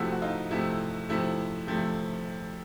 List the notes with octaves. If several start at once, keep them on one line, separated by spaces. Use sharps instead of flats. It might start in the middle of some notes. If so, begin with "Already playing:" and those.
Already playing: C3 F3 A3 E4 F#4
F#4
D#4 F4
C3 F3 A3 E4
C3 F3 A3 E4
C3 F3 A3